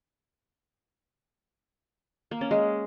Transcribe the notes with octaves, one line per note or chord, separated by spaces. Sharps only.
A#3
C#4
G#3